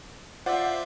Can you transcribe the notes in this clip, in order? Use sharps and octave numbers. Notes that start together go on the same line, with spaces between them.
F4 C5 D5 E5 F#5